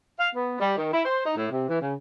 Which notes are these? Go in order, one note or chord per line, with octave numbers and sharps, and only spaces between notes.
F5
B3
G3
D#3
E4
C5
D#4
A2
C3
E3
C#3